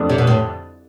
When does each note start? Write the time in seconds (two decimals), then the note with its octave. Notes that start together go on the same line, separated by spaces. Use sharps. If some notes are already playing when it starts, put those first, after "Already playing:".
Already playing: F2 D3 A3 D4
0.09 C3
0.18 B2
0.27 A2